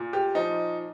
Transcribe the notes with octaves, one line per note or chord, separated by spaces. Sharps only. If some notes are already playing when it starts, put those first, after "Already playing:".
Already playing: A#2
G4
F3 D#4